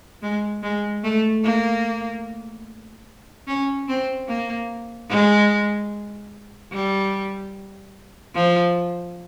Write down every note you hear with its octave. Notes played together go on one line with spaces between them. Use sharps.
G#3
G#3
A3
A#3
C#4
C4
A#3
G#3
G3
F3